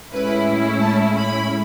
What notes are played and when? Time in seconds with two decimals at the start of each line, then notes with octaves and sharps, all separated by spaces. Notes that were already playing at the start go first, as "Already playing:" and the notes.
0.13 A2 G#3 C#4 E4 B4
0.82 A5
1.15 B5